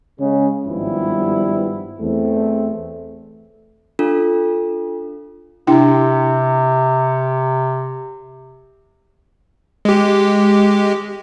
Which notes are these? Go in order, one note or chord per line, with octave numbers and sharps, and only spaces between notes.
C#3 G#3
G#1 G2 F3 G3 B3 E4
E2 A3 C4
D4 F4 A4
C3 D4 E4 G5
G#3 G4